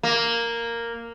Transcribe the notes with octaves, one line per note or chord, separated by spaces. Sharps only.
A#3